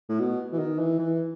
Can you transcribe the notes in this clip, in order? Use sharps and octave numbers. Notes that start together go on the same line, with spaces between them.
A2
B2
E3
D#3
E3
E3